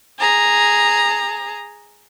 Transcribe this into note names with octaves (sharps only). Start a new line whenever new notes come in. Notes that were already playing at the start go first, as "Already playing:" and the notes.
G#4 A#5